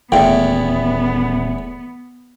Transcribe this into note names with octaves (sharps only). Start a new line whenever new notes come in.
D#1 E2 A2 B3 G5